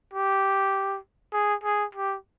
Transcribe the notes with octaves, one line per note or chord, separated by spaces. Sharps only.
G4
G#4
G#4
G4